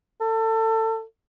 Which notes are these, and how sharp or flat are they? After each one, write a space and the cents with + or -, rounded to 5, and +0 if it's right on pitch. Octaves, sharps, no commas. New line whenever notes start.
A4 +25